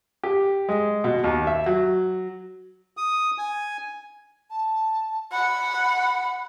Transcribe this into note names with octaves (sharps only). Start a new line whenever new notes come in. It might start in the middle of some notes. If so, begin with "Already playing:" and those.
G4
G#3
B2
D#2
E5
F#3
D#6
G#5
A5
F#5 B5